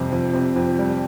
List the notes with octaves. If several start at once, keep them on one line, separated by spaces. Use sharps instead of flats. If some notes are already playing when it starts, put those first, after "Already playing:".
Already playing: F2 C3 G3
F2
C3
F2
G3